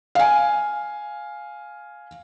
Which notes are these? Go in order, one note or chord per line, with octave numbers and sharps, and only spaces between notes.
F5 G#5